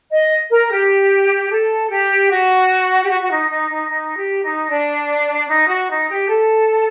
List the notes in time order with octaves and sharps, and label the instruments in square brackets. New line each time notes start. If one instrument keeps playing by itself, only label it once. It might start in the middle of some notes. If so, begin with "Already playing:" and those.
[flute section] D#5
A#4
G4
A4
G4
F#4
G4
F#4
F#4
D#4
D#4
D#4
D#4
G4
D#4
D4
D#4
F#4
D#4
G4
A4